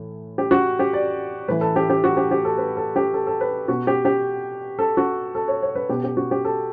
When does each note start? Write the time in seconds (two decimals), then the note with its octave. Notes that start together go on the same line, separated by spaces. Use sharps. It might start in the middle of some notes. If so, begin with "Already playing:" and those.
Already playing: A2 E3
0.38 G4
0.51 F#4
0.79 G4
0.93 D5
1.48 A2 E3 B4
1.61 A4
1.76 G4
1.90 G4
2.04 F#4
2.17 G4
2.31 G4
2.45 A4
2.58 B4
2.77 A4
2.96 G4
3.14 A4
3.27 A4
3.41 B4
3.68 B2 F#4
3.87 G4
4.05 G4
4.79 A4
4.97 F#4
5.35 A4
5.48 C#5
5.62 C#5
5.75 B4
5.89 B2 G4
6.04 G4
6.17 F#4
6.31 G4
6.45 A4